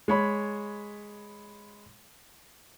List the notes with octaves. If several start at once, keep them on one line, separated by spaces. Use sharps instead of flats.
G#3 C#5 B5